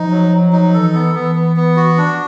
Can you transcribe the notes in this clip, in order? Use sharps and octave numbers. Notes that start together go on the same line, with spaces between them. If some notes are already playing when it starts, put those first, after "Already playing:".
Already playing: F3 D#4
F#3
F#3
D#4
E3 A4
B3
E3 B3
B3
B3
F#4
D4